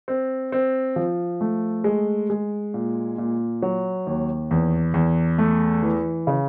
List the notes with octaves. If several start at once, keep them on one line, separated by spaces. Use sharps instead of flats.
C4
C4
F3
A3
G#3
G#3
A#2
A#2
F#3
D#2
E2
E2
A3
E3
C#3